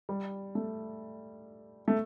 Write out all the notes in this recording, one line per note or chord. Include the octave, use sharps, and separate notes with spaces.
G3
A3
A3